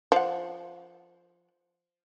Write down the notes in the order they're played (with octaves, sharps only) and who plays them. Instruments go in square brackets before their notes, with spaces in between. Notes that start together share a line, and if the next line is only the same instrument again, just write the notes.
[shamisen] F3 F#5